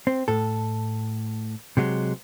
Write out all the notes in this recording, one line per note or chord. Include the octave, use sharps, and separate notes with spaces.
C4
A2 A4
C3 F#3 G#3